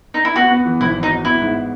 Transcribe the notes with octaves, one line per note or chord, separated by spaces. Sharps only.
D#4
E4
B3 F#4
B3
E3
G#1 E4
F#3
D#4
F#3
B3 E4
G#2